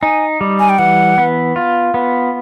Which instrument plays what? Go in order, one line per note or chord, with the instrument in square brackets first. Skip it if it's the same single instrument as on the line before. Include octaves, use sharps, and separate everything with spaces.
[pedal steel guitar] D#4 [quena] G#5
[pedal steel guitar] G3
[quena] G#5
G5
[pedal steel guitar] E3 [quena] F#5
[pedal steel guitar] B3
F4
B3